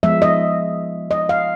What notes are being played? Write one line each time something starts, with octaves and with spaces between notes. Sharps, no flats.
F3 G#3 B3 E5
D#5
D#5
F5